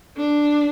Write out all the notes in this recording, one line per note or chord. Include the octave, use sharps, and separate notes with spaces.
D4